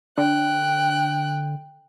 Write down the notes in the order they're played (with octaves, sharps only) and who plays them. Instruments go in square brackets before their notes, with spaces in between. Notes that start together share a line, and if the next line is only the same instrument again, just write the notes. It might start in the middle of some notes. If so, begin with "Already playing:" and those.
[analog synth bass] D3 [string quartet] G5 F#6